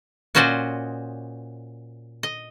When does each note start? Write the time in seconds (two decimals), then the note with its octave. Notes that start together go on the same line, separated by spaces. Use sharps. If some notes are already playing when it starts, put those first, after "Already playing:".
0.35 A#2 C#4 F#4 C5 D5 D#5
2.23 D#5